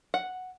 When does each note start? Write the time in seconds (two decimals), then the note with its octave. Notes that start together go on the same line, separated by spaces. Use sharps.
0.14 F#5